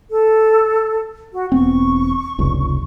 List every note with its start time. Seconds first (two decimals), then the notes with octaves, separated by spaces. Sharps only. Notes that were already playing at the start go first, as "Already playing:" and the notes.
0.10 A4
1.32 F#4
1.52 E1 B3 C4 C#6
2.38 F1 C#2 G2